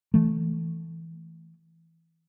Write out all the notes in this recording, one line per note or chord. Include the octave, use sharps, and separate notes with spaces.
E3 A3